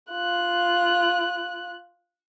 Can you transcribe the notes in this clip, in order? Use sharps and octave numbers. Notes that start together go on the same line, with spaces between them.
F4 F#6